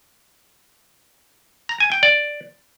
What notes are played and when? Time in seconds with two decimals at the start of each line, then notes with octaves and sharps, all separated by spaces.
1.69 A#5
1.80 G#5
1.92 G5
2.03 D5